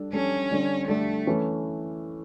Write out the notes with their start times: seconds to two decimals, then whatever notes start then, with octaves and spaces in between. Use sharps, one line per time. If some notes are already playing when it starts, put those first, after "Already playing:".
Already playing: G3 D4 A4
0.13 G3 C#4 D4 A4
0.51 D3 G3 D4 A4
0.88 D3 G3 A3 D4 A4
1.27 E3 A3 C#4 E4